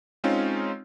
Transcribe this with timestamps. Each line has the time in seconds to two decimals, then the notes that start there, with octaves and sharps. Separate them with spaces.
0.24 G#3 C4 C#4 D#4 F4